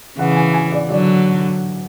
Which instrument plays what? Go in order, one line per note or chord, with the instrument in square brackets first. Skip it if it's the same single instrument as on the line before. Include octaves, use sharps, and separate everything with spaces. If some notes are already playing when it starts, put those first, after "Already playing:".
[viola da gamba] C#3 E3 [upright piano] F#5
[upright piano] G#5
G#5
D5
[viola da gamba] D3 F#3 [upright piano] D5